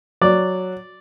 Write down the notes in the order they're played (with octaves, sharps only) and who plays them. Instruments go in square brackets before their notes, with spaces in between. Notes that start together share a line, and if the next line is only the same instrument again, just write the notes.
[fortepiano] F#3 D5